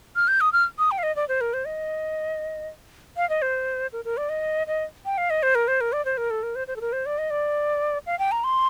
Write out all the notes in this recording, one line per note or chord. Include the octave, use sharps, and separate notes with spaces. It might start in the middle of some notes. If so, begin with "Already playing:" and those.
F6
G6
D#6
F6
D#6
G5
F5
D#5
D5
C5
A#4
C5
D#5
F5
D#5
C5
A#4
A#4
D5
D#5
D#5
G5
F5
D#5
C5
A#4
C5
A#4
D5
C5
A#4
A4
A#4
C5
C5
A4
A#4
C5
D5
D#5
D5
F5
G5
A#5
C6